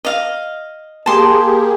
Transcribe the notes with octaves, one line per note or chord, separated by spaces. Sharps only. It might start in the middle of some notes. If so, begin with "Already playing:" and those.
D#5 F5
A#3 G4 G#4 A5 C6